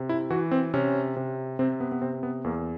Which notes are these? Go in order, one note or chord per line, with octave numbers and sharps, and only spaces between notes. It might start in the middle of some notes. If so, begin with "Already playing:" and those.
Already playing: C3
E4
E3 F#4
C4
C3 C#4
C3
C3 C4
B3
B3
C3 C4
B3
E2 A#3